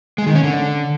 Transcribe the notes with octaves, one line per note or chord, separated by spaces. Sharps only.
G#3
D#3
C#4
D3